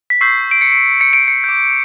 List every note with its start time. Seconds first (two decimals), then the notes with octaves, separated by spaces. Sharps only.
0.10 B6
0.21 C#6 E6 G6 C7
0.51 D7
0.61 C#7
0.72 D7
1.01 C#7
1.13 D7
1.28 C#7
1.44 D6 G6